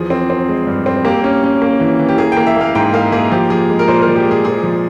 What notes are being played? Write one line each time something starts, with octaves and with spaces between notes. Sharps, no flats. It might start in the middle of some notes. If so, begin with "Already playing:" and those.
Already playing: E2 F3 G#4
C4
C4
G#3
G2
C4
A#3 G4
C#4
C#4
A#3
E3
E3
G4
A#3 G#4
A#3 G5
E5
A#3 F5
G#2 G5
A#3 F5
A#3 G#4
F3 G4
F3 G#4
G#3
A#4
A#2 C5
A#4
F3
G4
G#3
G#4
A#2 G#4
F3